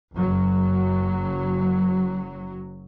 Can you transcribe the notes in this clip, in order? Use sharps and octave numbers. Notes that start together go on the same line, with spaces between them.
F#1 F#3